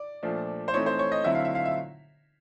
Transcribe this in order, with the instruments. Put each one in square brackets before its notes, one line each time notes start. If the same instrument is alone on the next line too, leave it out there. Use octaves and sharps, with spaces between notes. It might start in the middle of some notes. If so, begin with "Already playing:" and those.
Already playing: [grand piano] D5
A#2 F3 A3 D4
C5
E3 A3 C4 D#4 C#5
C5
C#5
D#5
D3 F#3 A3 C4 E4 E5
F5
E5
F5
E5